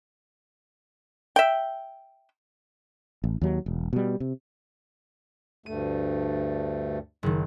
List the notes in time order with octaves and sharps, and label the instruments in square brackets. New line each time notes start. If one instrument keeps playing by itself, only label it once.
[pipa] E5 G5
[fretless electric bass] A1
D#2 F#3
E1
B2 G3
C3
[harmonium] D2 G2 A3 [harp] D#7
[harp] F#1 D#3